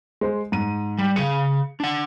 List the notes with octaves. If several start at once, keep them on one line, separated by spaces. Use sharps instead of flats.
G#3 C5 C6
G#2 D#7
G3
C#3 G#4 C#7
D4 F#5